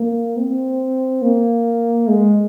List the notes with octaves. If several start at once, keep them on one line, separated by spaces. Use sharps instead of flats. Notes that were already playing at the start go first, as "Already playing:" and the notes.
Already playing: A#3
C4
A#3
G#3